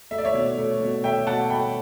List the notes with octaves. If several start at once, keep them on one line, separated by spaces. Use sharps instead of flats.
A3 E5
D5
C#5 E5
B2
A3
B2
A3 E5 G5
B2 F#5 A5
A3 G5 B5